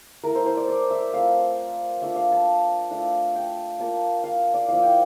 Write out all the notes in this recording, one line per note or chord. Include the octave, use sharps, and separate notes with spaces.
A3 E4 A#4
C5
C5
D5
D5
E5
A3 C4 F4 F5
A3 D4 F4 E5
F5
A5
A3 D4 F4
G5
A#3 F4 A5
F5
D5
F3 A#3 E4 F5
G5